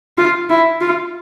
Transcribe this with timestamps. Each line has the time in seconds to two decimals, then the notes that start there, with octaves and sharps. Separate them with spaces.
0.18 F4
0.49 E4
0.81 F4